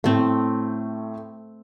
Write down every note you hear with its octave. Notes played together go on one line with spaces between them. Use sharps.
A2 A3 C4